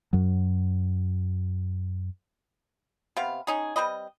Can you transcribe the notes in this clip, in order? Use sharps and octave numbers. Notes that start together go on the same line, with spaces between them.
F#2 F#3
C3 B3 F5
C#4 D#4 G#4
G3 C4 B4 D#5